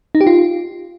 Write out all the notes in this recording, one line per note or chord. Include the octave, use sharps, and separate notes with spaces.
D#4
G4
F4